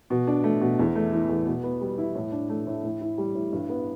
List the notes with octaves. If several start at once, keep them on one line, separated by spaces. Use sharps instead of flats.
B2
D4
A3
B2
E2
A3
E3
E2
B2
B3
G3
E4
A2
D4
A3
A2
A2
E4
G3
A2
G2
B3